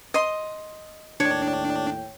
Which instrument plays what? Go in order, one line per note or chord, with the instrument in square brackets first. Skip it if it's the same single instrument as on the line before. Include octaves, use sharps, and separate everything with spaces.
[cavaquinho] D#5 C6
[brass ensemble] D#2 A2 G5 [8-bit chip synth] D4 [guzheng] C#5